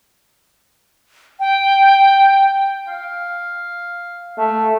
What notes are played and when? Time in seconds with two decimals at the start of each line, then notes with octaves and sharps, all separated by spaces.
1.40 G5
2.88 F5
4.38 A3